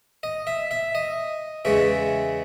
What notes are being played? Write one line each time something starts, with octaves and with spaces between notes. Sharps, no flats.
D#5
E5
E5
D#5
E2 C#3 G#3 C#4 E5